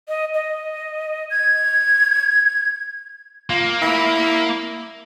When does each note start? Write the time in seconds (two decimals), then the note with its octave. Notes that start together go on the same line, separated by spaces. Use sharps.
0.08 D#5
0.34 D#5
1.30 G#6
3.50 A#3 F4
3.82 E4